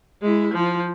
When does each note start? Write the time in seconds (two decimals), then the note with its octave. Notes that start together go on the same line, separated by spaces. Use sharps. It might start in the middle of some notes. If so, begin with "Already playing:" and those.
0.22 G#3 E4
0.53 F3